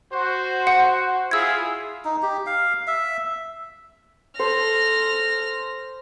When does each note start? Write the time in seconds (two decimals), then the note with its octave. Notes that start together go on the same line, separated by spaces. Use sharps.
0.12 F#4 C5
0.67 F#5
1.31 E4 F4 G#4 E6 G#6
2.05 D#4
2.22 G4
2.47 F5
2.87 E5
4.39 A4 C5 F6 A#6